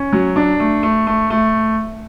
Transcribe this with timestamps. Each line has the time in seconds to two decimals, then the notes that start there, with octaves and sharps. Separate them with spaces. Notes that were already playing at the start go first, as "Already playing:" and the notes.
Already playing: C#4
0.13 F#3
0.36 D4
0.60 A3
0.83 A3
1.07 A3
1.30 A3